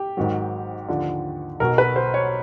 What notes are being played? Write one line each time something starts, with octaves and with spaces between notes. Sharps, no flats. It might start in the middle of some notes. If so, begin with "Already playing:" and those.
Already playing: G4
G#1 G#2 D#3 F#3
D#2 D3 F3
B1 B2 F#3 A#4
B4
C5
C#5